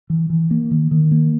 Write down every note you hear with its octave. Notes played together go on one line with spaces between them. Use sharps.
E3
E3
A#3
D#3
D#3
A#3